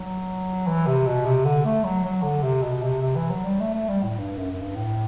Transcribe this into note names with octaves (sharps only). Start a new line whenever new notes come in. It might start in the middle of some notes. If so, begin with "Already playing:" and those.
Already playing: F#3
E3
C3
B2
C3
D3
A3
F#3
F#3
D3
C3
B2
C3
C3
E3
F#3
G3
A3
A3
G3
A2
G2
F#2
F#2
G2
A2